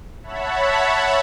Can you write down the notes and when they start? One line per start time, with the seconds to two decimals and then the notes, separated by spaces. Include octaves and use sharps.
0.23 C#5 E5 F#5 A5 B5